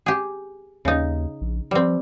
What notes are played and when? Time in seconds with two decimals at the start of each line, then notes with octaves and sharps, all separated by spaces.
0.06 G4 G#4
0.85 D#2 C#3 D#4
1.41 A#1
1.71 F3 G3 C4